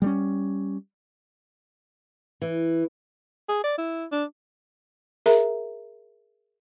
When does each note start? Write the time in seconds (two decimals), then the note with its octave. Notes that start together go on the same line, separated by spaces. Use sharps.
0.02 G3 G#3 C#4
2.42 E3
3.49 G#4
3.64 D5
3.78 E4
4.12 D4
5.26 G#4 A#4 E5 A#5